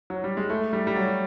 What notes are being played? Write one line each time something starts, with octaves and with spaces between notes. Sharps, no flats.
F#3
G3
G#3
A3
G3
G3
F#3